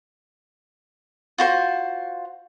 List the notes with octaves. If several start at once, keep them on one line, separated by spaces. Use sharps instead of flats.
F4 F#4 C5